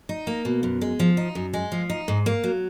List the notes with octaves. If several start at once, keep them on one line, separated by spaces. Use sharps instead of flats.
D#4
A#3
B2
F#2
G#3
F3
D#4
F#2
G#3
F3
D#4
G#2
A#3
F#3